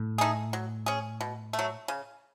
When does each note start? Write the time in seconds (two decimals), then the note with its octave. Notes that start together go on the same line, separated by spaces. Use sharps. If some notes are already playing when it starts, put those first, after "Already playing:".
Already playing: A2
0.18 A3 D#4 G#4
0.53 F#3
0.86 C#4 G#4
1.21 B2
1.53 A3
1.59 F#3
1.88 C#3